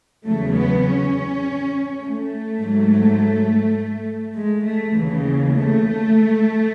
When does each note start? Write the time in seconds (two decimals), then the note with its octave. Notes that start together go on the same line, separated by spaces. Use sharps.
0.25 E2 C#3 F#3 A3
0.54 B3
0.84 C#4
2.01 A3
2.59 G#2 F#3
4.35 G#3
4.65 A3
4.94 D#2 C#3 E3
5.53 A3